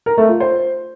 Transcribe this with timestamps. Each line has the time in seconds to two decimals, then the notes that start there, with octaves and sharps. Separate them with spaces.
0.06 A#4
0.18 A3
0.29 F4
0.40 C5